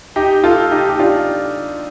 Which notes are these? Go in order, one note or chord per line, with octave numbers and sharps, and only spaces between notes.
D#4 G4
F4 A4
D#4 G4
G4
D4 F4